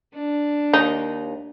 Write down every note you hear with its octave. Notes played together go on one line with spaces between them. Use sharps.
D4
D#2 D#4